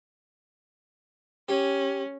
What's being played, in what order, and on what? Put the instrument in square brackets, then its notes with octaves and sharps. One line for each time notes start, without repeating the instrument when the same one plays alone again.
[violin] C#4 [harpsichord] G4 G#5